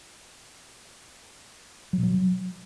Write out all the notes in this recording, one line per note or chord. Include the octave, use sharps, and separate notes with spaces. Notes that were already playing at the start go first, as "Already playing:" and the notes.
F#3
B2
F#3